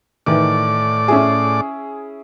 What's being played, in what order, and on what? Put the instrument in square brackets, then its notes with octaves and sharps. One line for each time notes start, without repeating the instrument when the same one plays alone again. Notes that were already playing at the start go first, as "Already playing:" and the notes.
[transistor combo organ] A2 D5 D6 [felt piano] D#3 E3
[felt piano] C#4 E4 G#4